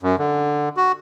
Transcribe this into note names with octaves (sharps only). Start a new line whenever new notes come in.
F#2
D3
F#4